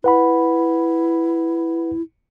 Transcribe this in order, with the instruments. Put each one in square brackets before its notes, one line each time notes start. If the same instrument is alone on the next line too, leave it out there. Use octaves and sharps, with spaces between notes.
[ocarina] E4 [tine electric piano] B4 F#5 B5